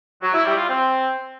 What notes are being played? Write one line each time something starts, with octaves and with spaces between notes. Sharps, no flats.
F#3
E4
G3
F4
C4